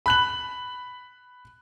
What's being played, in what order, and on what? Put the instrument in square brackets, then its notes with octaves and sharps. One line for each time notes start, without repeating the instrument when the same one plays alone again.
[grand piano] B5 F#6 F#7